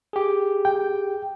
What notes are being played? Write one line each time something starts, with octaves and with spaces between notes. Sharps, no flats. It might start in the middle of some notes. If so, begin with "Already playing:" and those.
G4 G#4
G5